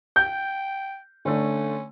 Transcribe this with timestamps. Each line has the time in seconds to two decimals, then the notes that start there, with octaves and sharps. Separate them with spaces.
0.16 G5 G6
1.25 D3 A3 C#4 D4